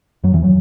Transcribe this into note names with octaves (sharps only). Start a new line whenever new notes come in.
F#2 F#3
E2 E3
F#3